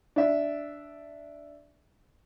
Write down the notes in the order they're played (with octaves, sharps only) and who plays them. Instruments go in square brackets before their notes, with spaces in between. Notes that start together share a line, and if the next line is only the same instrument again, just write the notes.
[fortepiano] D4 E5